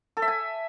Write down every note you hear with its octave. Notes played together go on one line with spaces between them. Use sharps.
A4
E5
G#5